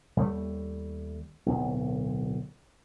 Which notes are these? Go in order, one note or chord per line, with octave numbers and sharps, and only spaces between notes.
D#2 G3 A3
D1 B1